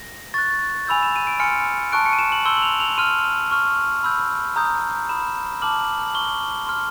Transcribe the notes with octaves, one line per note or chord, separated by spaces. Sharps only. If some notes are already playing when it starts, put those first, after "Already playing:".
Already playing: A#6
C#6 F#6 A6
G#5 B5 E6 G6 F7
E7
D#7
D7
G#5 C6 F6 C#7
A5 C#6 F#6 D7
C#7
D#7
E7
F#7
C6 E6 G6 G7
F#7
F7
F7
C6 F6 D#7
C#6 F6
B5 E6 G6
A#5 D#6 G6
B5 D#6 G6 E7
A5 D6 F6 F#7
F#7
C#6 F6 G7
C6 F6